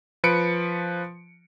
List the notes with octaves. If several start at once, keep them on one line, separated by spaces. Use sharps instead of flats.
F3 B4 C#7 D7